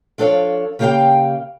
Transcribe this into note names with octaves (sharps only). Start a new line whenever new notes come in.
F3 D4 A4 C#5 F5
C#3 A#3 G4 G#4 F5 G5